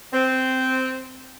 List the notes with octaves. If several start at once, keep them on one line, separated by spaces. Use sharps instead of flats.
C4